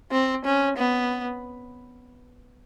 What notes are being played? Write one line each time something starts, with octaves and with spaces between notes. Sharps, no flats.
C4
C#4
B3